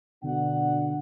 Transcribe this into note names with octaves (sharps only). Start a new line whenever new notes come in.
B2 D3 D4 F#5